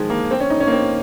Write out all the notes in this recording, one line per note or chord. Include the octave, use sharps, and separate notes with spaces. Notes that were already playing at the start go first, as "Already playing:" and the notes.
Already playing: D#3 F3 G#3
A#3
C4
C#4
D#4
C#4
A#3
C4